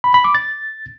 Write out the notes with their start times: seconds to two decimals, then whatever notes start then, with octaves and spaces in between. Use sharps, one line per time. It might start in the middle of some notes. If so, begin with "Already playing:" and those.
0.04 B5
0.14 B5
0.24 D6
0.35 A6